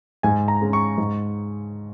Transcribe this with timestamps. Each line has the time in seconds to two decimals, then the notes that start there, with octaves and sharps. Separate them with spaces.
0.23 G#2 G#5
0.48 A#5
0.61 G#3 C#4
0.73 C#6
0.98 G#2